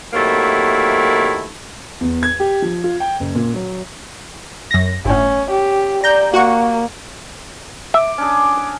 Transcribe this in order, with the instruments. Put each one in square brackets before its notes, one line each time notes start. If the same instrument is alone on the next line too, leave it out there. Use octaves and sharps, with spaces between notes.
[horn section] C3 D#3 F#3 A3 A#3 E4
[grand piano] E2
G#6
G4
F3
F4
G5
F#1
A#2
F#3
[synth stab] F#2 A#6
[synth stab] G1 A2 [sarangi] C#4
[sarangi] G4
[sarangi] D5 [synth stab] A#5 G6
[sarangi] A#3 [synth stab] F#4 F#5 C#6
[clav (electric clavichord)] E5 [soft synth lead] D6
[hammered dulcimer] C#4 D4 G#4